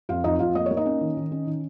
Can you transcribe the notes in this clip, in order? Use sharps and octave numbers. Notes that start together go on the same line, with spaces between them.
F2 F4 F5
F2 D#4 D#5
F2 F4 F5
A#3 D#5
A#3 C#5
D#4 D#5
C#4
D#3
D#3
C#4
D#3